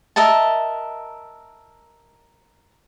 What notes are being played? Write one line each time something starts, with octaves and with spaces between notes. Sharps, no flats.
A#4 D#5 E5 A5